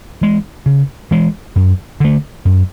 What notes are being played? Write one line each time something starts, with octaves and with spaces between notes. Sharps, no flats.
E3 G#3
C#3
E3 G#3
F#2
D3 A3
F#2